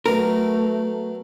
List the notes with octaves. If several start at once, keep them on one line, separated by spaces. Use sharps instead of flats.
F#3 A3 B3 A#4